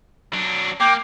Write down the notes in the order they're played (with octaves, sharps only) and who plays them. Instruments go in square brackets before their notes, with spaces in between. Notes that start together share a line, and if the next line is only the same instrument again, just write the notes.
[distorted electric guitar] F#3 D4
[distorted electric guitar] A#3 [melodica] G5 D6